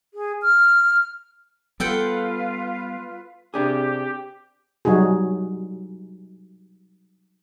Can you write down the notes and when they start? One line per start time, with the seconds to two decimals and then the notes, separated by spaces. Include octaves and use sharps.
0.14 G#4
0.42 F6
1.80 G3 B3 F4 A4 B4 F#5 G5
3.54 C3 D4 G4 G#4
4.85 F#3 G3 D#4 F#4 G#4